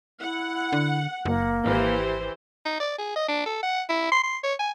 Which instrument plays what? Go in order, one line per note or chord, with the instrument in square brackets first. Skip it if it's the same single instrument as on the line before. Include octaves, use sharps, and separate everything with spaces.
[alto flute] E4 [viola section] F#5
[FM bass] D3
[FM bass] F#1 [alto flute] A#3
[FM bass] G#1 [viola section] E3 G4 C5
[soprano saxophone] D#4
D5
G#4
D#5
D4
A4
F#5
E4
C6
C6
C#5
G#5